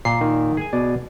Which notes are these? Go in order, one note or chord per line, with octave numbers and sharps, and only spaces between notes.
A#2 C7
D#3
G#4 G#5
B2 D5